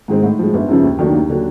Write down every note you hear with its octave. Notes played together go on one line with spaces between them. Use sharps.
G#2 D#3 G#3 C4
A2
F3 G#3
G1
F#2 C#3 F3
D#2
D#3 F#3 A3 D4
D#2
D3 F#3